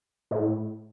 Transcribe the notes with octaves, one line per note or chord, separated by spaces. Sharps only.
A2